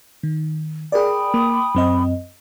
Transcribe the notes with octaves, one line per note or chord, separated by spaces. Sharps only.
D#3
G#4 A#4 D5 G5 B5 D#6
A#3 D6
F#2 C4 D#5